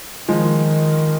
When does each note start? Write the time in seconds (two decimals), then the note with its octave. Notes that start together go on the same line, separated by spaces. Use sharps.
0.29 D#3 F3 G#3